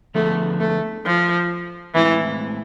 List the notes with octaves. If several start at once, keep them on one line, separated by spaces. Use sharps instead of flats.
D3 F3 A3 B3 E4 G#4
A3
F3
A2 E3 G#3 C4 E4